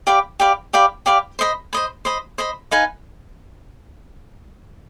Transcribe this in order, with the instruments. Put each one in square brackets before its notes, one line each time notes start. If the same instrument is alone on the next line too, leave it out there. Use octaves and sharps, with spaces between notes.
[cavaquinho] G4 D5 F5 B5
G4 D5 F5 B5
G4 D5 F5 B5
G4 D5 F5 B5
C5 D#5 B5
C5 D#5 B5
C5 D#5 B5
C5 D#5 B5
D#4 B4 F5 G#5